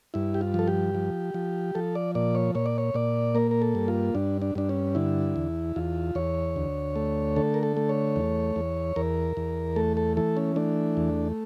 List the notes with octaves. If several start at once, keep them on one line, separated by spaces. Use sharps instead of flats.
G2 E4
G4
F4
F3 A4
G4
F3
F3
F3 A4
D5
A#2 D5
C#5
A#2 C#5
D5
C#5
A#2 D5
A#3 A#4
A#4
A4
G2
F4
G2 D4
D4
G2 D4
C#4
D3 E4
E2
E2 F4
E2 C#5
D2
A3
D3 A4
A#4
A4
A3
C#5
E2
E2
E2 A#4
E2
A3 A4
A4
E3 A4
C#4
A3 D4
E2